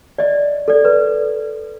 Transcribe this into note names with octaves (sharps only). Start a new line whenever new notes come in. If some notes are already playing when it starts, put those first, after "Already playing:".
D5 D#5
A4 D5
B4